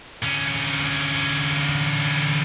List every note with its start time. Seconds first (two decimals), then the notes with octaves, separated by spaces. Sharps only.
0.23 D3 C#4